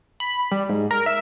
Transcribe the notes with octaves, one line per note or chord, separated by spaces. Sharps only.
B5
G3
G#2
A#4
E5